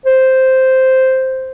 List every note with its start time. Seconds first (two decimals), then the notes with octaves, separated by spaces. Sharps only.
0.06 C5